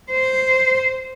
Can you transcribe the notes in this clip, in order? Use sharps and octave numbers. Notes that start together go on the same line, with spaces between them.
C5